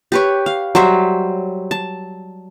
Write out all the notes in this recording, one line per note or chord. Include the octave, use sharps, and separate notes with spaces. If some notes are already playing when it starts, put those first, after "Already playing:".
G4 B4 C#5
F5
F#3 G3 C5 E5
A5